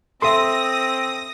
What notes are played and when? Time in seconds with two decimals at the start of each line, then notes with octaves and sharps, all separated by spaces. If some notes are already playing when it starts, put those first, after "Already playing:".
0.22 C4 A4 E5 C6 D#6 A#6